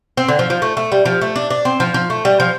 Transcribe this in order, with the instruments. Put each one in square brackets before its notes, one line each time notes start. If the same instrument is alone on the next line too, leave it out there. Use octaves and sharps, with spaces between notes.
[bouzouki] C4
D3
F3
F3
A3
A3
G3
F3
A3
D4
D4
C4
F3
F3
A3
G3
F3